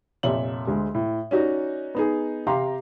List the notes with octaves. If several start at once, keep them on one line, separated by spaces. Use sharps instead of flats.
F1 A#2 C#5 E5 F#7
D2 G#3
A2
C#4 D#4 F#4 D5
B3 D#4 G#4
C3 G4 F5 A#5 C6